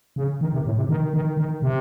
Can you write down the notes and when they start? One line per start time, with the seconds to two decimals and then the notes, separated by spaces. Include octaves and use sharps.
0.16 C#3
0.41 D#3
0.53 C3
0.65 A2
0.77 C3
0.89 D#3
1.13 D#3
1.37 D#3
1.62 C3